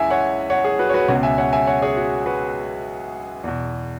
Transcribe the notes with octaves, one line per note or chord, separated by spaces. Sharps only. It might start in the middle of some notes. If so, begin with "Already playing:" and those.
Already playing: C#2 C#3 E3 E5 G#5
C#5 F#5
C#5 F#5
G#4
F#4 B4
C#5
F#4 B4
C#2 B2 C#5 F#5
E5 G#5
C#5 F#5
E5 G#5
C#5 F#5
G#4 C#5
F#4
F#4 B4
E2 B2